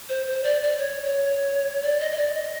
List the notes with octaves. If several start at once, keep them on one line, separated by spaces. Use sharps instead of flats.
C5
C5
D5
D5
C#5
C#5
D5
D#5
D#5
D5
D#5